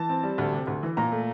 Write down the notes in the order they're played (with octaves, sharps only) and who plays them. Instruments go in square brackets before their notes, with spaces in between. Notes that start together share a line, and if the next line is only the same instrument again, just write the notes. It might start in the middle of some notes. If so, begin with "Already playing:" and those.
Already playing: [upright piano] E3 [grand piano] A5
[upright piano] C4
G3
D2
C3
D2
E3
[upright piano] A#2 [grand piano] A#5
[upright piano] A3